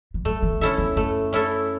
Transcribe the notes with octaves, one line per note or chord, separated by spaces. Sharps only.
E3
F#3 A3
E3
D#3 C#4 E4 A4 E5
E2
F#2 A3
C#4 E4 A4 E5